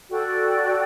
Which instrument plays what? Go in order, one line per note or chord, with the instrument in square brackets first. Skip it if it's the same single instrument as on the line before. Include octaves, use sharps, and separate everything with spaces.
[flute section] F#4 A4 D5 G5